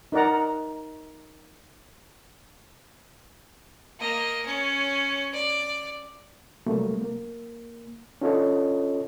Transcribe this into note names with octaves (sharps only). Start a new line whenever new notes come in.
D#4 A#4 D5 F#5 A#5
A#3 D#5
C#4 C#5
D5
C3 F#3 G3 A3 A#3
A#3
C#4 D4 F4 A4 C#5 D#5